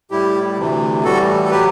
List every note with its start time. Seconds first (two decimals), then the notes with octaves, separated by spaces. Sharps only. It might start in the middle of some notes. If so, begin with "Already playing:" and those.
0.11 A2 G3 E4 G4
0.58 D2 C3 E3
1.04 A2 E3 G3 F#4 A4
1.45 A4
1.50 F#3 G4 B4